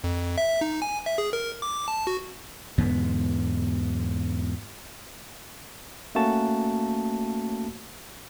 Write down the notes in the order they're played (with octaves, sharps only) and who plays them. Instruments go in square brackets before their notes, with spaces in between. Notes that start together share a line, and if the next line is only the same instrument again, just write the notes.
[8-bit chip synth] F2
E5
D#4
G#5
E5
G#4
A#4
D6
A5
F#4
[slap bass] E2 G#2 D3 B3
[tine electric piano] A3 A#3 C#4 F#4 A5